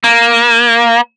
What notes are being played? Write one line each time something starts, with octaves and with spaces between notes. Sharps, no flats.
A#3